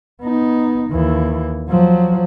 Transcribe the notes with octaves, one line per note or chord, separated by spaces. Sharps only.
B3 D#4
D#2 E3
F3 F#3